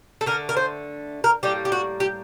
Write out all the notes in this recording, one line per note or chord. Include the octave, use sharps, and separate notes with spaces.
A4
D3 A#4
A3
A#4
C5
A#4
A2 G3 A#3 G4
G4
F#4
G4